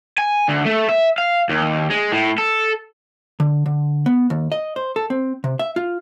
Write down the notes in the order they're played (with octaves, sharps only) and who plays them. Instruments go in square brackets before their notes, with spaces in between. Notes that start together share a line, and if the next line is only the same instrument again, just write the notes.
[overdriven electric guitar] G#5
D2
A3
E5
F5
D#2
G#3
A2
A4
[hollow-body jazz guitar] D3
D3
B3
D#2
D#5
C5
A4
C4
C3
E5
F4